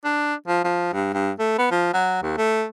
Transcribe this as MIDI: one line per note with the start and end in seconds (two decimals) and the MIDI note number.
0.04 0.34 62
0.48 0.63 53
0.64 0.90 53
0.93 1.12 43
1.14 1.31 43
1.39 1.54 57
1.58 1.67 59
1.71 1.91 53
1.93 2.21 54
2.22 2.36 39
2.38 2.64 57